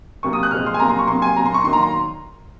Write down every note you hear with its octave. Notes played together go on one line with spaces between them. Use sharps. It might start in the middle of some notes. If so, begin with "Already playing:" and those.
C3 F#3 A#3 C#6
D#6
F#6
A#2 F3 G#3 F6
C6
G#5
C3 F#3 A#3 A#5
C6
C#6
C3 F#3 A#3 C6
G#5
A#2 F#3 A#3 A#5
C6
C#6
D#3 F#3 A#3 C6
A#5
C6